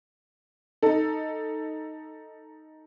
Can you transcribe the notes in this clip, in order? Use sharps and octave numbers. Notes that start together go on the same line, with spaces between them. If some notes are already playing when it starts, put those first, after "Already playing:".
D#4 A4